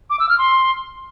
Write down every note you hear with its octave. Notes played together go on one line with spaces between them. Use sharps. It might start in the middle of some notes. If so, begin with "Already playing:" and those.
D6
E6
F6
C6